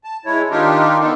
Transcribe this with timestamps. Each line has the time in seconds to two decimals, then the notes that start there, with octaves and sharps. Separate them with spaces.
0.04 A5
0.26 G#3 E4 C#5
0.51 D#3 D4 D#4 F4 G4 A#4
1.00 B3 D4 D#4 A4